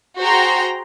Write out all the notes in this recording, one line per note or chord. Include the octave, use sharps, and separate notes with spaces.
F#4 G#4 C5 G5 A#5 C6